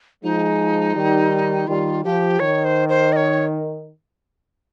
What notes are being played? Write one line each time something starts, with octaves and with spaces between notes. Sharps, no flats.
F3 G#3 D#4
D#3 G3
D#3 G3 F4
F3 G4
D#3 C#5
C5
C5
D#5
C#5